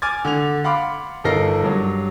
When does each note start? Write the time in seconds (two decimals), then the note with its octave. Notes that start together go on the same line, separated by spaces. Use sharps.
0.02 G#5 D6 F6 G#6 A6
0.25 D3 F7
0.64 F5 F#5 B5 C6 D6
1.24 G1 D#4 A4 A#4 A#6 C7
1.63 G2 F#3